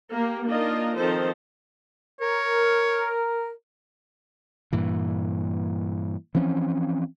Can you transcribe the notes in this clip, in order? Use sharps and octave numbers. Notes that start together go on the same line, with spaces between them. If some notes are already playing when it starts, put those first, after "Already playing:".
A#3 G4 A#4
A#3 D4 D#4 F4 A#4 D#5
D#3 F3 C4 A4 C5
A#4 C#5
G2 A#2 E3
E3 F3 C4 C#4